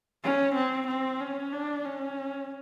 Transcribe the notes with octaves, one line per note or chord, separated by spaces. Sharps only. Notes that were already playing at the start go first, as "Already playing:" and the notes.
C#4
C4
C4
C#4
D4
C#4